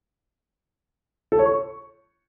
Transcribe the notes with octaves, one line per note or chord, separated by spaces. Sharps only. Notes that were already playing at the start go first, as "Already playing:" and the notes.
A4
C#5
C#6